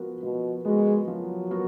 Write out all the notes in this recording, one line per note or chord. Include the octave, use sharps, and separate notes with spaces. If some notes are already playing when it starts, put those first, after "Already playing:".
Already playing: F3 B3 F#4 A#4
B2 F3
G#3 B3 F#4 A#4
F3 F#3
B3 F#4 A#4